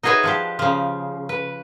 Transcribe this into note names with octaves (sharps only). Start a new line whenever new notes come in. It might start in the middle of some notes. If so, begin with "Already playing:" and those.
D#4 F#4 G#4 B4 C#5 E5
F3 D4 G4
C#3 F3
B4